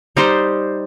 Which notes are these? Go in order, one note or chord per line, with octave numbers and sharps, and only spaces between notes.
G3 D#4 G4 C5